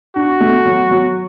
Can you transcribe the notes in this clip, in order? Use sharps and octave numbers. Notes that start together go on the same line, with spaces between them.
D4 F#4
A3
F#3
F#3